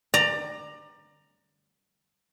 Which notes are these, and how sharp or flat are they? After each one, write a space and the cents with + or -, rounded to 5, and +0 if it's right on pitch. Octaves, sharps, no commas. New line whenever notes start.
D5 +25 A#5 +0